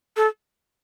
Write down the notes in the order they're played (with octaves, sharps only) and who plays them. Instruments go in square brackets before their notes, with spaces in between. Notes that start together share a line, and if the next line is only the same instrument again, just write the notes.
[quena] A4